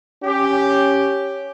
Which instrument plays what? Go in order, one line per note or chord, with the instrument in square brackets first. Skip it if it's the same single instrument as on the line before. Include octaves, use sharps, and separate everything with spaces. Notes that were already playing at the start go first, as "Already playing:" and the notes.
[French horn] C#4 [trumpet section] G4